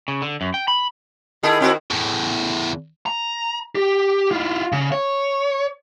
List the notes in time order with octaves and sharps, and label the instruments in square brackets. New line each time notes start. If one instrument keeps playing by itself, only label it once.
[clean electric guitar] C#3
D3
F#2
G5
B5
[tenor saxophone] D#3 [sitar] E4 G#4 A4
[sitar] C4 E4 F#4
[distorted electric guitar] E2 A2
[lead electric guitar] A#5
G4
E4 F4
C#3
C#5